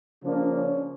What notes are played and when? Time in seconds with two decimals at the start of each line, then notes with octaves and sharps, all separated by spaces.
0.24 C#3 F3 A#3 D4
0.54 C#4